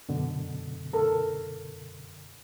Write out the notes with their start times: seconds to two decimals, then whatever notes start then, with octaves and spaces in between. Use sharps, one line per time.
0.09 F#2 B2 D3
0.93 A4 A#4